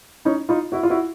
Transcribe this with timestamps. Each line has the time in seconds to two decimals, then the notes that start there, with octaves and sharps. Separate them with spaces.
0.25 C#4 D#4
0.49 D#4 F4
0.72 E4 F#4
0.83 F4
0.90 E4 F#4